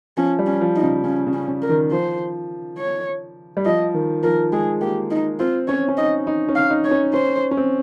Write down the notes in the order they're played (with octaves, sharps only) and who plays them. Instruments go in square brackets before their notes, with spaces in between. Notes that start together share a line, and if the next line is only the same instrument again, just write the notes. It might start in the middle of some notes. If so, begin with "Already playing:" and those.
[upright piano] F3 [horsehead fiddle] C#4
[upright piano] G3
[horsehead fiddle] C#4
[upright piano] F3
[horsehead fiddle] D#4
[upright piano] C#3
[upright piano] C#3 [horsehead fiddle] C#4
[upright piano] C#3
[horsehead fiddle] C#4
[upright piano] C#3
[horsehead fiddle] A#4
[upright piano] D#3
[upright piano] F3 [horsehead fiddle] C5
[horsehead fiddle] C#5
[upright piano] G3
[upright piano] F3 [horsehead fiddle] D#5
[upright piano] D#3
[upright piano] F3 [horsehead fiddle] A#4
[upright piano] G#3 [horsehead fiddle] G#4
[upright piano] A#3 [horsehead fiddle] G4
[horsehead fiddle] D#4
[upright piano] C4 [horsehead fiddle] F4
[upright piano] C#4 [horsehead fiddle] C#5
[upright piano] C#4
[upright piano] D#4 [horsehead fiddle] D#5
[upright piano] D#4
C#4
[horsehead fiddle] F5
[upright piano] D#4
[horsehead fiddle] C#5
[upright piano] C#4
[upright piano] C#4 [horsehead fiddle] C5
[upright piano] C#4
C4